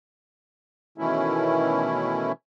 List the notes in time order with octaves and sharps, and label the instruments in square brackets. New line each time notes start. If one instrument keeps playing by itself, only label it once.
[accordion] B2 D#3 E3 A3 C#4 E4